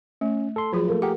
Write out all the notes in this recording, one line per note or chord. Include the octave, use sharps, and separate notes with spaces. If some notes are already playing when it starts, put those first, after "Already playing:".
A3 C#4
A4 C6
F3 F#3 F4 G#4
A3 A#3
G4 G#4 A#4 F#5